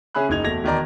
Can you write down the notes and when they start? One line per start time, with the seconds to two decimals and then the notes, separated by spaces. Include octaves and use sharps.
0.15 C#3 C#4 G#4 E5 B5 F#6
0.29 F#1 G#3 D#4 G#6 F7
0.44 E1 A3 G#6 A#6 F7
0.64 E1 D#3 D5 A#5